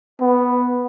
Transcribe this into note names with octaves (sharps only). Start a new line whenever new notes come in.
B3